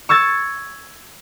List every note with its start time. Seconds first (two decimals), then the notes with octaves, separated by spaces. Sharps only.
0.09 C#6 E6 G#6 A6